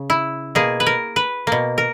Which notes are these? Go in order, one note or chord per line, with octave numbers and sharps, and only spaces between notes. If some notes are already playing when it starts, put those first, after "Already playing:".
Already playing: C#3
E4
B2 A#3 G#4
B4
A#4
B4
B2 A#3
A#4